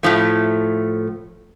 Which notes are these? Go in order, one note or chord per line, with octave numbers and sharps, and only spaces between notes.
A2 F3 A3